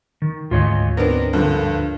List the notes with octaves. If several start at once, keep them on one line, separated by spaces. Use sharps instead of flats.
D#3
D2 G#2 F4 C#5 D#5
B3 C4 D4 A#4
G2 D3 F3